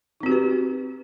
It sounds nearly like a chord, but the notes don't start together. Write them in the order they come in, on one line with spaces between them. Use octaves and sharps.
D#4 C4 F#4 G4 B4